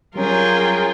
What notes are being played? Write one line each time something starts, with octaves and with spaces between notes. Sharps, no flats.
F#3 G3 C#4 F4 G#4 A#4 G5